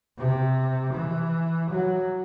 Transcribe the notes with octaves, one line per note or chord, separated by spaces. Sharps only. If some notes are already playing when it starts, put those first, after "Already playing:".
C3
E3
F#3